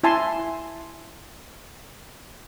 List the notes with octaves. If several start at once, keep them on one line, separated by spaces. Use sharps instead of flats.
E4 E5 G#5 A5 C6